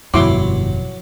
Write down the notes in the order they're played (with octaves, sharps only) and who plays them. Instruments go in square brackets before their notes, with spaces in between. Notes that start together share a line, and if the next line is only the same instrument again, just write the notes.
[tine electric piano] G1 [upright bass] F2 B2 [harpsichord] F#3 [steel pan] E4 C6 D6